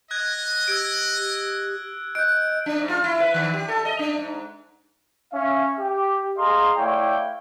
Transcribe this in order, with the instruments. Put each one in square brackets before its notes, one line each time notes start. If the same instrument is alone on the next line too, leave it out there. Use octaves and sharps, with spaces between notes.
[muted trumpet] D#5 [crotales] F#6 G#6
[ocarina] G4 [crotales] E6 G#6 D7
[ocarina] D#5 [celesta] F#6 G6 [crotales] D7
[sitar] D4
G#2
F4
E4
B4
D#3
G4
A4
D#5
D4
G#2
[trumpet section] C#4 E5 F5
G4
G#4 D#5 F5 A#5 C6
A3 E4 C#5 D5 F5 G5